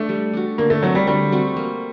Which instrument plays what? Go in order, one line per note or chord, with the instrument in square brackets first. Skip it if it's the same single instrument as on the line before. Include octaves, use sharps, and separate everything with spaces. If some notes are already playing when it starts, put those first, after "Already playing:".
Already playing: [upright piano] A3 [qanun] D4
[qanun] G3
D4 F#4
[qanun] D3 [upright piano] A#3
[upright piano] A3
[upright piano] F#3 [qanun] A3 C4 F#4
[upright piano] G3
[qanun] D3 [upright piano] G3
[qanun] A3 C4 F#4
A#3